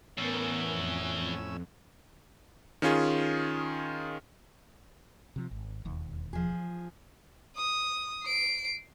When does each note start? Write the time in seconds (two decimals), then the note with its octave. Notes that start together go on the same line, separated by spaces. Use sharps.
0.18 E2 A2 B3 C#4 A#4 E6
0.69 F2
2.82 D#3 C#4 F4 G#4
5.36 C3 F3
5.51 G#1
5.85 E1 D#2
6.33 F3 G#4
7.56 D#6
8.24 C7 D7